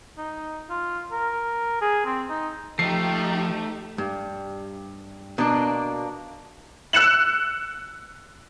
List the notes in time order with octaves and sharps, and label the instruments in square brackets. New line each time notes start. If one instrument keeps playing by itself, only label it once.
[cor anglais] D#4
F4
A#4
G#4
C4
D#4
[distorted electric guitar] F3 [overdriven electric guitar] A3 [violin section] D#4 G4 [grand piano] C7
[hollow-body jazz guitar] G2
[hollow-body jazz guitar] B2 [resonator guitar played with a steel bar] A#3 D4
[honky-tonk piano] E6 F#6 C#7 E7 F#7